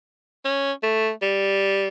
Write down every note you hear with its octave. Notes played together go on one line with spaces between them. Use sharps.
C#4
A3
G3